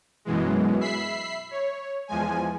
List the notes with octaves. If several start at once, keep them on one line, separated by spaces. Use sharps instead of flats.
F#2 B2 E3 G#3
E5 B5 B6 C7
C#5
E2 F3 G#3 G#5